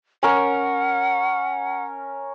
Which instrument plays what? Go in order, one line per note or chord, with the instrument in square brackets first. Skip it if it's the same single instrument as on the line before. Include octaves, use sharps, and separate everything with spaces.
[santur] C#4 A#4 [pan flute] F#5